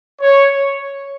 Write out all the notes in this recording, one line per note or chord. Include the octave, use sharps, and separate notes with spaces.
C#5